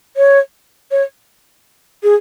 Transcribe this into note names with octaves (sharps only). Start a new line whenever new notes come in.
C#5
C#5
G#4